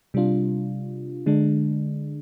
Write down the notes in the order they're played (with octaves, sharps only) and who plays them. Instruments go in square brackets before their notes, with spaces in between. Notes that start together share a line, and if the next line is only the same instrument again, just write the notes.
[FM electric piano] C3 G3 D4 F4
D3 G#3 D4